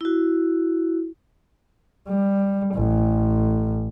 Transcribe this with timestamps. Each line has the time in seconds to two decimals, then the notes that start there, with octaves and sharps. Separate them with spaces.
0.01 E4 F#4
2.08 G3
2.74 A1